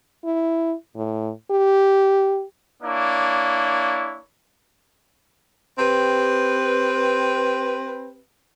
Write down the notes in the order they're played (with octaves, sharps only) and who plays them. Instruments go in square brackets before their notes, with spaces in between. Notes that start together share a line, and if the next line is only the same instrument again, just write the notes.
[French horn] E4
A2
G4
[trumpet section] A#3 D4 E4 C#5
[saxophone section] C4 G4 B4